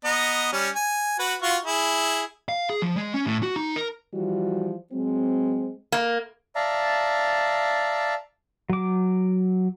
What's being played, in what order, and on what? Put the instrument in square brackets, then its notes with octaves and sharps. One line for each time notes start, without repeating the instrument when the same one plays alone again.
[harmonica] B3 D#5 A#5
G3 C#4
G#5
F#4 B4
F4 F#4 C#6
E4 G#4
[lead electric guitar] F5
G#4
F3
G#3
C#4
A2
F#4
D#4
A#4
[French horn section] E3 F3 G3 F#4
F#3 G#3 C4
[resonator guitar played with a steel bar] A#3
[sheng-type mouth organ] D5 E5 F5 A5 A#5
[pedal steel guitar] F#3 D6